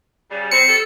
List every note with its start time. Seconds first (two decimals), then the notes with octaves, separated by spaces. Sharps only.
0.31 C#3 G3
0.52 C4 C#7
0.68 G3 A4